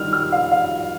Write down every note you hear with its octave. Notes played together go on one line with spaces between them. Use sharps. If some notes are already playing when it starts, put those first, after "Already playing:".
Already playing: D#3 G3 F6
F6
F5
F5